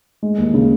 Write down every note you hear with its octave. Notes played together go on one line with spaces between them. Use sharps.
G#3
D#2
C#3